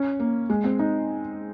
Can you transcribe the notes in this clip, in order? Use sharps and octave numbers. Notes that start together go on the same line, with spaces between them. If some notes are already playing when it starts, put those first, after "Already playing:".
Already playing: C#4
A#3
G#3
C4
D#4